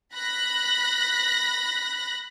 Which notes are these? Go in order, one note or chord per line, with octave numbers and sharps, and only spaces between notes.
B5 F#6 A#6